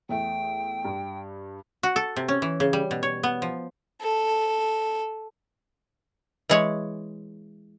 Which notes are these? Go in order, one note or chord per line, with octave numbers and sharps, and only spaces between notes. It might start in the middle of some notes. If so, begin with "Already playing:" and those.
E2 A3 G5
G2
F#4
A4
C3
C#4
E3
C#3
G3
B2
C#5
B3
F3
A4
E3 G#3 C#5